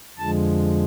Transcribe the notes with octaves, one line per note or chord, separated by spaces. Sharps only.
F2 D3 F3 G#3 A5